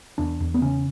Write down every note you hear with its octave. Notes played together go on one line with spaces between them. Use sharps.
E2 D4
E2
B3
C#3 C#4